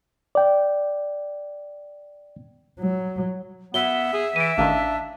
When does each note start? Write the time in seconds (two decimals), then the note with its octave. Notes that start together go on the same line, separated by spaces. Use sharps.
0.35 D5 G5
2.79 F#3
3.74 F#2 B3 E5 G7
4.14 G#4
4.36 E3 D7 D#7
4.58 A1 D#3 D4 F5